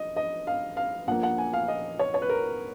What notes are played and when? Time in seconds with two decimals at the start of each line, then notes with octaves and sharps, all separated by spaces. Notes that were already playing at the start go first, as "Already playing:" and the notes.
Already playing: D#5
0.16 D#5
0.47 F5
0.77 F5
1.07 A#1 A#2 F3 A#3 F#5
1.23 F#5
1.38 G#5
1.53 F5
1.68 D#5
1.99 C#5
2.14 C#5
2.22 B4
2.30 A#4